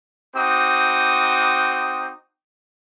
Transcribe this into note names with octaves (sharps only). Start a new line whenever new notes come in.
C4 D#4 F#4 D6 D#6